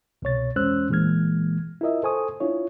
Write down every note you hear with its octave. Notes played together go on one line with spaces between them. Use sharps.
C2 B2 C#5 A6
E2 G#3 C#4 C5 E6 F#6
A#2 E3 G#3 A#3 F6 G#6
E4 F4 A#4 D#5 E5
A4 C5 G#5 C#6 D#6
D4 E4 F4 C#5